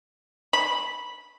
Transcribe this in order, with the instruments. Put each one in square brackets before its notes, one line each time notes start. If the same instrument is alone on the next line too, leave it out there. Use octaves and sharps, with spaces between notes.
[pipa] B5